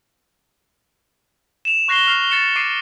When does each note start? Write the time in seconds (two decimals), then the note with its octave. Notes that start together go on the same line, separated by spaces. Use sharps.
1.65 E7 F7
1.88 C#6 F#6 A#6 C7 E7 G7
2.07 F6 C7 F7
2.30 A6 C#7 E7
2.56 D6 C7 D7 D#7